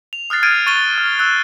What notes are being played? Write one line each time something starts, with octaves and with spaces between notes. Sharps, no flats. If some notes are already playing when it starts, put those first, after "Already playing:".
F7
D#6 F6 F#6 A6 C7
F6 G#6 D7 D#7
C#6 A6 D#7 G7
F6
E6 F#6